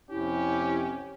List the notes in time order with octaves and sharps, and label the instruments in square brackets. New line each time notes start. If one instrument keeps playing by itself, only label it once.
[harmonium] F2 C3 [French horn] C#4 [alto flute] E4 [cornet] G4